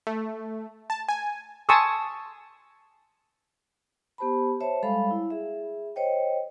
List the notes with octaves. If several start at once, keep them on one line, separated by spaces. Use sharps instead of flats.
A3
A5
G#5
G#5 A5 C6 C#6 D#6 E6
B3 G4 C5 A5 B5
C5 C#5 E5 A5
G3 G#3 A4 F5 B5
E4
G#4 E5
C5 C#5 D#5 G5